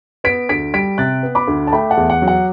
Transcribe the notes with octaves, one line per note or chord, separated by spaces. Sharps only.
B3 B6 D7
D2 B6 D7
G3 B6 D7
C3 F#6 A6
B3
B5 D6
D2
A5
A3 G5 B5
F#5 A5
E2
F#5
F#3
F#5